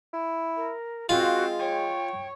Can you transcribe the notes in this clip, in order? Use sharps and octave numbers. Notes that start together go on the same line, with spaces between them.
E4
A#4
G#3 C4 F4 F#4 F5
C#5 G5